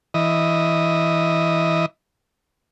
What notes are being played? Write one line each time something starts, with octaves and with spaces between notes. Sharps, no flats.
E3 D#5